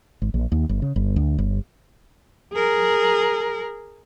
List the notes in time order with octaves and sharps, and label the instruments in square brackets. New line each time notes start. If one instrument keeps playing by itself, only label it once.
[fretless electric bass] G#1
A#1
D#2
G1
C#3
G1
D2
G1
[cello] G#4 A#4